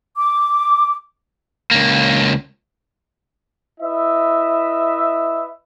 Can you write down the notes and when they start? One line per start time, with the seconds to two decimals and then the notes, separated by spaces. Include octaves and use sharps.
0.16 D6
1.71 C#2 A#3
3.81 E4 B4 D#5 E5